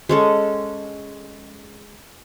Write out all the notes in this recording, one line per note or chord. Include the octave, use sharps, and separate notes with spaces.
G#3 C#4 A4